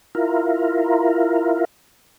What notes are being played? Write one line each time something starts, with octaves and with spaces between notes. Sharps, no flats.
E4 F4 A#4